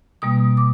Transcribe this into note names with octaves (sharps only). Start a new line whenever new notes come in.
B2 G3 A#3 D#6
D6